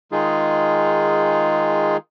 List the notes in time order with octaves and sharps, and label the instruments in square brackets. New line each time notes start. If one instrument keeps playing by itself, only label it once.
[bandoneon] D#3 G#3 D#4 F4 G#4